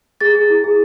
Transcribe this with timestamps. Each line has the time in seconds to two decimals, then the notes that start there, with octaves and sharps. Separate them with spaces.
0.21 G#4 A6
0.35 G#4
0.50 E4
0.64 G#4